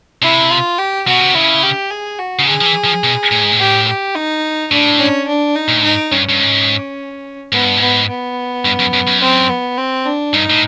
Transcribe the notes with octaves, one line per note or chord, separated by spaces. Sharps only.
C3 E4
F4
G4
B2 F#4
C3
C#3 E4
G4
G#4
F#4
C#3
D3 G#4
F3
E3
F3
B2
A2
G#2
A2
G4
G4
D#4
A2 D4
C#4
D4
D#4
A#2
A2
G#2 D#4
G2 C#4
G2
G#2
G#2 B3
G2
G#2 B3
B3
G2
F#2
F#2
F#2
C4
B3
C4
D4
G2 D#4
A2